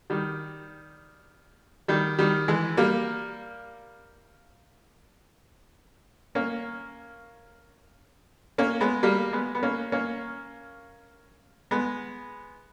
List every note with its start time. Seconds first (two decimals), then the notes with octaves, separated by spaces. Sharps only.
0.10 D#3 G3
1.88 D#3 G3
2.18 D#3 G3
2.48 E3 G#3
2.77 G3 A#3
6.35 A#3 C#4
8.58 A#3 C#4
8.80 G#3 B3
9.03 G3 A#3
9.32 G#3 B3
9.55 B3
9.63 A#3 C#4
9.92 A#3 C#4
11.71 G#3 B3